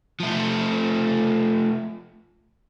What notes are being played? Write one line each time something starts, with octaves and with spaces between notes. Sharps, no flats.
F3 A3